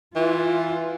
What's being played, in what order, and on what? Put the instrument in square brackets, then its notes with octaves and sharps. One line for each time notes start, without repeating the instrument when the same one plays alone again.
[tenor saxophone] E3 [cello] F4